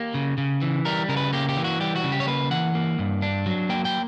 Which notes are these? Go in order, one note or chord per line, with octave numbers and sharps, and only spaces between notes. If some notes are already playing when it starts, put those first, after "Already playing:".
Already playing: A#3 G4
C#3
C#3
E3
G3 A#4
C#3 A#4
B4
A#3 G4
G4
E3
F#4
G3 G4
F#4
C#3
G4
C#5
A#3 B4
E3 F#5
A#3
G2
D4
F#3
A#3 G5
G5